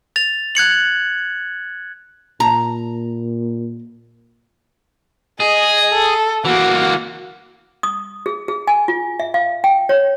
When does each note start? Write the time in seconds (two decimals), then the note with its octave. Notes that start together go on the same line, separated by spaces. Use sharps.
0.16 A6 F7
0.55 F#6 G#6 C#7 F#7
2.40 A#2 A#5
5.40 G#4 D#5
5.92 A4
6.45 E3 A#3 F#4
7.83 D#6
8.26 G#4
8.48 G#4
8.67 G#5
8.88 F4
9.20 E5
9.34 F5
9.64 G5
9.89 C#5